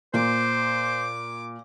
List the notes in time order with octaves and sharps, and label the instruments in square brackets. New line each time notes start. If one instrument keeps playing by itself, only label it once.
[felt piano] A#2 [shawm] C5 [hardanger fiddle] D6